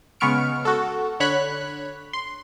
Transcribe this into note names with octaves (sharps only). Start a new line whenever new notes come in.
C#3 G#3 B3 C#6 F6 D7
F#4 A4
D3 C#5 B5 F#6
C6